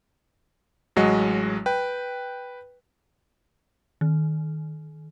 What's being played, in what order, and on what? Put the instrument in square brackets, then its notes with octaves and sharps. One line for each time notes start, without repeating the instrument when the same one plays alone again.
[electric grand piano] A1 F#3 G#3 F#4 D#5
B4 G5
[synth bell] D#3